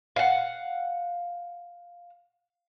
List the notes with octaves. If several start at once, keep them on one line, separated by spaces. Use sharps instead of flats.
F5 F#5